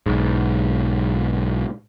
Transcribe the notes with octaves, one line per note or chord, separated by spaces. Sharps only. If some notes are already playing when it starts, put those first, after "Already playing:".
B1 G#2